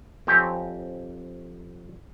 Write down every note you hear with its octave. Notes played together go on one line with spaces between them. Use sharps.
F2 C4 G4 C#5 E5 G#5